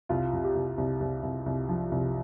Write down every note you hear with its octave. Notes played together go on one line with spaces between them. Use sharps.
C2 F4
C3
G4
C2
C2
C2
C2
C2
F3
C2